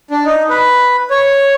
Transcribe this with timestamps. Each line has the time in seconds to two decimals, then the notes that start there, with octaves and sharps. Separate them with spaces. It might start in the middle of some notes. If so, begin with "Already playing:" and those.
0.11 D4
0.25 D#4
0.49 B4
1.10 C#5